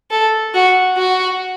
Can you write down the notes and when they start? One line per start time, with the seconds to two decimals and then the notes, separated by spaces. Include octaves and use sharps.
0.11 A4
0.54 F#4
0.97 F#4